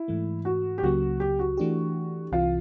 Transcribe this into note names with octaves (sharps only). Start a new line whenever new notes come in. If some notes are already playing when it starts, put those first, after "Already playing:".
Already playing: E4
G#2 E3 A3
F#4
G4
C#2 C#3 F#3 A#3 F#4
G4
F#4
E3 A3 D4 G4
C2 C3 E3 F4